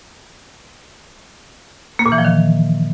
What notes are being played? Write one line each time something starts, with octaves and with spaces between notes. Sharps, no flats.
A#3
A#2
E3
F3
D#3